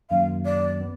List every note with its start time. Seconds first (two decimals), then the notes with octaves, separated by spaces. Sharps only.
0.10 F#2 D#3 F#3 A#3 F5
0.45 D5
0.81 B3